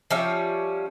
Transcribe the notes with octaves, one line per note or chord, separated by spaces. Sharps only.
F3 G3 C#4 E5